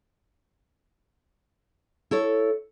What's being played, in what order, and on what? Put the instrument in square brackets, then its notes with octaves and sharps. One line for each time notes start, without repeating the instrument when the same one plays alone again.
[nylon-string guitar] E4 A4 C#5